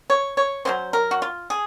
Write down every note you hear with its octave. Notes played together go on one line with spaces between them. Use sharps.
C#5
C#5
F#3 A#3 C#4 C5
A#4
F#4
F4
G#4